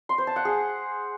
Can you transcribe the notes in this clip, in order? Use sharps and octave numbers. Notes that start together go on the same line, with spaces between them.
C6
C5
A5
F#5
G#4